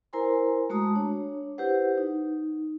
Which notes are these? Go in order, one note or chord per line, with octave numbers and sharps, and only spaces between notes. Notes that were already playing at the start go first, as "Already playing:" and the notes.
E4 A#4 C5 G#5 A#5 C6
G#3 A3 F#4 A5 A#5 D#6
D4 C#5
E4 G4 B4 C5 F#5
D#4